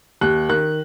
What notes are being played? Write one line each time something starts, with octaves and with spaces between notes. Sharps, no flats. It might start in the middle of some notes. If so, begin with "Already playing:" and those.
D#2 F#6
D#3 F#6